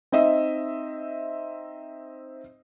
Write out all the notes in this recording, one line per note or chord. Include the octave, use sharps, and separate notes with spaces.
C4 D#4 D#5 E5